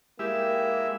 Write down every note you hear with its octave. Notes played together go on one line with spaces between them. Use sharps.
G#3 A#3 E4 G4 E5